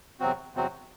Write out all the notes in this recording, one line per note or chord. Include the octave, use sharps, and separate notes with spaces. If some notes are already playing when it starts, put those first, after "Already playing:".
E2 C3 F#3 C4 F#4
E2 C3 F#3 C4 F#4